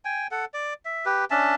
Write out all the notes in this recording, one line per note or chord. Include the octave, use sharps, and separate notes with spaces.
G5 G#5
A4 F#5
D5
E5
G4 B4
C#4 D4 E5 A5